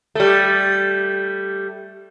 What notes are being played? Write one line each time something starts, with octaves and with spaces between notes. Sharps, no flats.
G3 A3